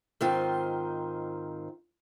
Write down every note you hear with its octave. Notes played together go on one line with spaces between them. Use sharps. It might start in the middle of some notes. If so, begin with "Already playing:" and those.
G#2 D#3 C4 F4